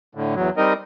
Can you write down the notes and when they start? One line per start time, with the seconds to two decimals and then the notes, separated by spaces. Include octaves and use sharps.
0.15 A2 D3
0.35 E2 F#3
0.57 G3 C4 D#4 A#4 D#5